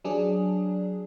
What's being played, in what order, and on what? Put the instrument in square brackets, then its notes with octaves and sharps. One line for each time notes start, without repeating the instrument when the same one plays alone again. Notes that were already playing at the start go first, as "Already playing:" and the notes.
[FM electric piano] F#3 D4 G#4